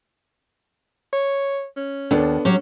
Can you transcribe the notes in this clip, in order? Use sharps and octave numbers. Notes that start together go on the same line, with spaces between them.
C#5
C#4
D#2 B3 D4 A4
F#3 C#4 G4